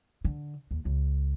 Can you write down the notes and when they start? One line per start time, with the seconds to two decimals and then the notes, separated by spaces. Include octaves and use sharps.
0.25 D3
0.71 D#2
0.85 C#2